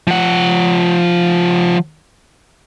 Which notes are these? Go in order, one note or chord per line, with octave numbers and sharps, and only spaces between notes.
F3 F#5